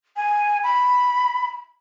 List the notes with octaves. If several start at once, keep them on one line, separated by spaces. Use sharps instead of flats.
G#5
B5